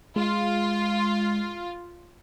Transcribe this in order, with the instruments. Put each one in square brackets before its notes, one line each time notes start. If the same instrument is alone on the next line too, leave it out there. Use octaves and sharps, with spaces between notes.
[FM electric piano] G#3 [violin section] F4